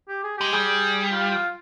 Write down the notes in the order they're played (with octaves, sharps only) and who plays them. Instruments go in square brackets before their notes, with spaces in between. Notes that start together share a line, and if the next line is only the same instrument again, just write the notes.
[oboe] G4
G#4
[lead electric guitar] G#3 [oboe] G4
[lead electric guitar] G3 [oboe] G#4
[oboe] F4
F4